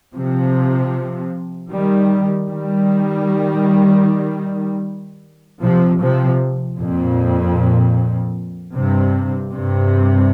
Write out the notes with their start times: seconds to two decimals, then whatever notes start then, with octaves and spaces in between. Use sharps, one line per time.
0.14 C3 F3
1.70 D#3 G3
2.49 D#3 G3
5.61 C3 F3
6.00 C3 F3
6.78 F2 A#2
8.74 G2 C3
9.52 G2 C3